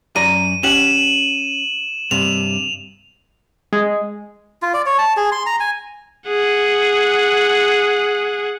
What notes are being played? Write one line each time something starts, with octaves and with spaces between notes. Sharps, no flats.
F#2 D5 A#5 D#7
C#4 G4 F#5 E7 F#7
G2 C3 F7
G#3
F4
D5
C#5
A5
G#4
C6
A#5
G#5
G#4 F#5